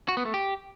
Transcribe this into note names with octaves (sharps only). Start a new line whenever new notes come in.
F#4
B3
A3
G4